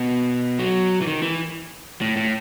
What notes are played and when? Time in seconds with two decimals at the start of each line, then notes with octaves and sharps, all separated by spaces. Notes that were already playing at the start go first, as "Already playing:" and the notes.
Already playing: B2
0.59 F#3
1.02 E3
1.07 D#3
1.23 E3
2.01 A2
2.17 A2